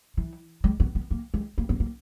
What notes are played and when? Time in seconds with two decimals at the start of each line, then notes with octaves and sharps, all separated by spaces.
0.17 E3
0.64 G#3
0.80 B3
0.95 B3
1.11 A#3
1.34 G#3
1.58 A#3
1.69 B3
1.80 A#3